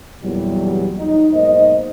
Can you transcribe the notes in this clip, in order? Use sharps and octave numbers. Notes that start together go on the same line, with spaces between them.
E2 A#2 F#3 G3
D#4
B1 G#2 A#3 C5 D#5